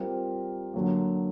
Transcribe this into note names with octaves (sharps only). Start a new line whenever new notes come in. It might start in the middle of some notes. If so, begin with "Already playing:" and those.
Already playing: G3 C4 F4 A#4
D3 F#3 A#3